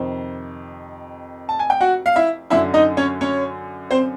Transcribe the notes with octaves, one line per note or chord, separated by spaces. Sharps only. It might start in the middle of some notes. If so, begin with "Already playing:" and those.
Already playing: F2 C3 D#3 C5
A5
G#5
G5
F#4 F#5
F5
E4 E5
F#2 D3 E4 E5
D#4 D#5
C#4 C#5
C#4 C#5
C4 C5